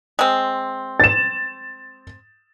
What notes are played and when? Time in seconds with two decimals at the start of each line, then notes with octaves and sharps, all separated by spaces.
0.19 G#3 C4
1.00 A6 E7